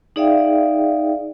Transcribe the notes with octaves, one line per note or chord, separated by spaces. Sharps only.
D#4 G#4 D5 E5 F5 G5